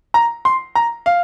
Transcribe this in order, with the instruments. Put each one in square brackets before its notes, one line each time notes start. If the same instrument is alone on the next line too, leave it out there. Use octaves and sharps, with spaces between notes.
[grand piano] A#5
C6
A#5
F5